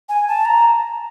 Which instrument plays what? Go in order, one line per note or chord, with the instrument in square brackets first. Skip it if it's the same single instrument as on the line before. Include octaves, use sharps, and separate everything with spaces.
[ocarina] G#5
A5
A#5